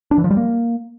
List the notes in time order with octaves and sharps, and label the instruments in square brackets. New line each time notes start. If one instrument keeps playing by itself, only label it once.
[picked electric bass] D4
E3
F3
G3
A#3